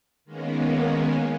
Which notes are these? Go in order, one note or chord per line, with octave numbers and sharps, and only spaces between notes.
D#3 G#3 A#3 B3 C#4